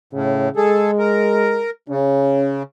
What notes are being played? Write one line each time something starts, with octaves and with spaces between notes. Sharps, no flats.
A2 C#3
G#3 G#4 A4
A#4
C#3 C#4